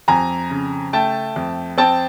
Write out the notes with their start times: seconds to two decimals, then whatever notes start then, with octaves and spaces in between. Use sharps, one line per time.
0.08 F2 G#5 A#5
0.50 C#3
0.93 A3 G5 A5
1.36 F2
1.78 C4 G5 A5